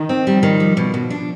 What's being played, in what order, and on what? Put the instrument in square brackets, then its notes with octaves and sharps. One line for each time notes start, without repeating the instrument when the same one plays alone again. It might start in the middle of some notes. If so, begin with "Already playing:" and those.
Already playing: [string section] D#3
[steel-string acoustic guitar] C4
[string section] F3 [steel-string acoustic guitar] G3
[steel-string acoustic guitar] D#3
G3
B2
B2
D4